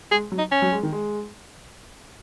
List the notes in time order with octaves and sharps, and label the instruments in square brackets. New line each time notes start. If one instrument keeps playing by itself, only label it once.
[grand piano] G#3 [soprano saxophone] G#4
[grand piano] F#3
[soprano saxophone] D#4
C#4
[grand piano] F#3
G#3
D#3
G#3